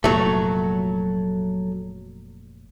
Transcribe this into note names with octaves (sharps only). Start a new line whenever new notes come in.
F1 A#2 F#3 A3